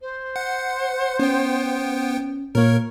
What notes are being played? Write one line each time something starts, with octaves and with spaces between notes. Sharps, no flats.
C5
F#5
B3 C#4 G5
A#2 A#3 A#4 C#5